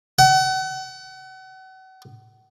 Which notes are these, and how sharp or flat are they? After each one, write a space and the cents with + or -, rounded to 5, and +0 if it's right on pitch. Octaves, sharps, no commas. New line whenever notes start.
F#5 +35